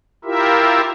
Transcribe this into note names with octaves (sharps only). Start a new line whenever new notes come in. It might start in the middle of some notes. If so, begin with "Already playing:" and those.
E4 F4 G4 A#4 E5